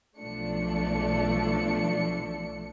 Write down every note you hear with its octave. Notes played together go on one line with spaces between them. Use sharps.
B1 F3 A3 D4 C#7